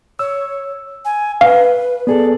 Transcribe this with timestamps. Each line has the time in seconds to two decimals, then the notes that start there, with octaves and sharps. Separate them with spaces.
0.19 C#5 E6
1.05 G#5
1.41 B4 F5
2.07 B3 G#4 A4 D5